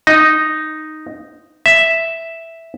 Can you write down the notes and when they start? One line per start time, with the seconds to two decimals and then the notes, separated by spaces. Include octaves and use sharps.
0.07 D#4
1.66 E5